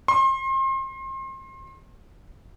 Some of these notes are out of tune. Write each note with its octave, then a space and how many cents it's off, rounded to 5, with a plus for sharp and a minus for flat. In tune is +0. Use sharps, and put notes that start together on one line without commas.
C6 +35